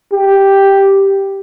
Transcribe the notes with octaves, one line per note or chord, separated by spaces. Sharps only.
G4